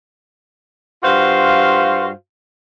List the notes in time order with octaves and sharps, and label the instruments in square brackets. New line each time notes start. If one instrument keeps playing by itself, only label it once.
[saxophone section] G2 F4 F#4 C5 F5